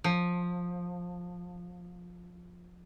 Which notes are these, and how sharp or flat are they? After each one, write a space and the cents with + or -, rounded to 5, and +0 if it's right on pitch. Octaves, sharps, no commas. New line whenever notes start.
F3 +15